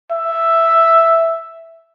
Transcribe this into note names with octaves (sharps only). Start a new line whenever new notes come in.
E5